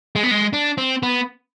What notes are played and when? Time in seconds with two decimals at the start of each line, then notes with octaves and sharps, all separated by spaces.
0.16 G#3
0.23 B3
0.31 G#3
0.53 D4
0.78 C4
1.03 B3